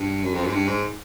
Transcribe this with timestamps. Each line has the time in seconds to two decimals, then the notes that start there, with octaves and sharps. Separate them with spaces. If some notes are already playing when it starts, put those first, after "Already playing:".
Already playing: G2
0.24 F#2
0.34 F2
0.44 F#2
0.48 G#2
0.53 G2
0.67 G#2